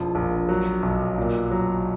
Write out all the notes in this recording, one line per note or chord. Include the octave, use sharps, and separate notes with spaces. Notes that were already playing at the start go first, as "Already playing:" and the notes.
Already playing: E1 F3
A#1
F#3
B1
A#2
F#3